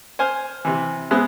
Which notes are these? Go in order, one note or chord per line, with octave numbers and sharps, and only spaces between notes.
C5 G#5 F6
C3 E3
G#3 B3 C5 E5 F#6